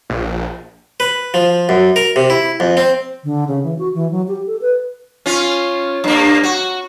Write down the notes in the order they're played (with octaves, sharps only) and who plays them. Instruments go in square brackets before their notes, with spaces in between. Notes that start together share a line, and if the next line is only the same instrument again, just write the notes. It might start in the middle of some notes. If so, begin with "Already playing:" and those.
[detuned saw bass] A#1
[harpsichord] B4
F3
F#2
A#4
C3
E4
F2
C4
[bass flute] D3
C#3
E3
F#4
E3
F#3
G4
A4
B4
[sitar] C#4 F4
G2 A#3
F#4